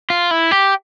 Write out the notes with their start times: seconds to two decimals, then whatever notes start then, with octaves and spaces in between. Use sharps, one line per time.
0.10 F4
0.31 E4
0.51 G4